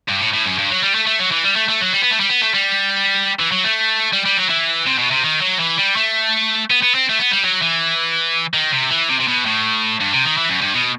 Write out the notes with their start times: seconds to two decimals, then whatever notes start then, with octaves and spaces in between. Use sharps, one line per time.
0.09 G2
0.21 A2
0.34 A2
0.46 F#2
0.58 G2
0.70 F#3
0.82 G3
0.95 A3
1.07 A3
1.19 F#3
1.31 E3
1.44 G3
1.56 A3
1.68 A3
1.81 F#3
1.93 G3
2.02 B3
2.11 A3
2.20 G3
2.29 B3
2.41 A3
2.54 G3
3.40 E3
3.52 F#3
3.64 A3
4.13 G3
4.26 G3
4.38 F#3
4.49 E3
4.87 C3
4.98 B2
5.11 C3
5.23 D#3
5.42 F#3
5.60 E3
5.78 G3
5.96 A3
6.70 B3
6.83 B3
6.95 C4
7.09 A3
7.19 B3
7.31 G3
7.44 F#3
7.62 E3
8.54 D#3
8.72 C3
8.90 E3
9.09 C3
9.20 C3
9.27 B2
9.46 A2
10.00 G2
10.13 C3
10.25 D#3
10.38 E3
10.50 F#2
10.62 G2
10.74 B2